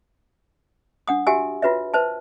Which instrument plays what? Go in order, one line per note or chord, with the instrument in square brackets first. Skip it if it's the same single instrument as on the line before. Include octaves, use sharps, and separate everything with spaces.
[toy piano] D4 F#5 D#6
F#4 G4 E5 G#5 E6
F4 F#4 B4 C#5 E5
B4 C5 E5 A5